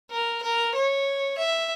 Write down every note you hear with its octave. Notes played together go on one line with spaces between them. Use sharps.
A#4
A#4
C#5
E5